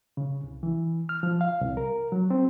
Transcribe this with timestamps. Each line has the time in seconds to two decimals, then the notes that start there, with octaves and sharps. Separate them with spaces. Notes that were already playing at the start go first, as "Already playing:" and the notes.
0.17 C#3
0.44 C2
0.63 E3
1.09 F6
1.23 F3
1.41 F5
1.61 C2
1.77 A#4
2.12 F#3
2.30 C4